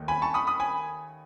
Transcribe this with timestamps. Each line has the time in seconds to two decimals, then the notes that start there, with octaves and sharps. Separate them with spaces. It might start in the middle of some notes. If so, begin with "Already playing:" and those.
Already playing: D#2 D#3 A3
0.08 G#5 B5
0.22 A5 C#6
0.34 B5 D#6
0.47 B5 D#6
0.60 G#5 B5